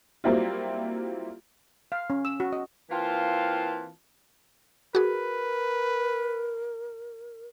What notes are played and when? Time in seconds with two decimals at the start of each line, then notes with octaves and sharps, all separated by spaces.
0.24 F#3 G3 A#3 C4 E4 F4
1.92 F5
2.10 C#4
2.25 E6
2.40 F#4
2.53 D#5
2.90 E3 A#3 C4 F4 F5 A5
4.95 F#4 G#4 A#4 B4